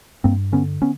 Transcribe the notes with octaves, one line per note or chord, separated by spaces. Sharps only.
G2 A#3 C4
D3 B3 C#4
B3 C#4